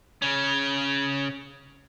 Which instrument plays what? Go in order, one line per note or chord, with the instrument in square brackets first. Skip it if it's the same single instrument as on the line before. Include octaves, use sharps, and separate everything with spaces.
[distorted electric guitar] C#3 C#4